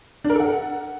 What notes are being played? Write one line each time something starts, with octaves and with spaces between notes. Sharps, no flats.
D4
A#4
A4
F#5